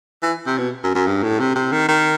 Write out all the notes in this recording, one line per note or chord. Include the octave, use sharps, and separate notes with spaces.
E3
C3
B2
F#2
F#2
G2
A2
C3
C3
D#3
D#3